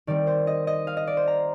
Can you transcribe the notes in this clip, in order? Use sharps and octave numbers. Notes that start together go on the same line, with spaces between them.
D#3 G3 C4 D5
C5
D#5
D#5
F5
D#5
D5
C5
A#5